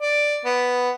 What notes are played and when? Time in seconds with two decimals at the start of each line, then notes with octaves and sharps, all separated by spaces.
0.01 D5
0.45 B3